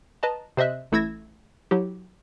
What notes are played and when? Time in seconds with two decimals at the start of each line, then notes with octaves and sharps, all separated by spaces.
0.23 B4 D#5 A5 A#5
0.57 C3 C5 D#5 E5 F#6
0.92 A1 A3 E4 E6 G#6 A#6
1.71 F#3 E4 G4